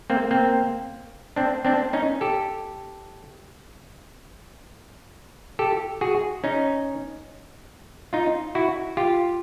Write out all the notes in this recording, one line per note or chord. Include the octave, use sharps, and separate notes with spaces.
A#3 C4
A#3 C4
C4 D4
C4 D4
C#4 D#4
G4 A4
G4 A4
F#4 G#4
C#4 D#4
D#4 F4
E4 F#4
F4 G4